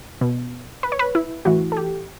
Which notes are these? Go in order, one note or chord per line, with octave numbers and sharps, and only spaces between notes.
B2
B4
C#5
B4
E4
A2 E3 F#4
A4
G4